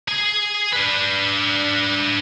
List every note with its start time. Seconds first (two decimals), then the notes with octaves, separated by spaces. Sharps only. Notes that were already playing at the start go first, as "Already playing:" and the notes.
0.08 G#4 G#5
0.72 D4 B4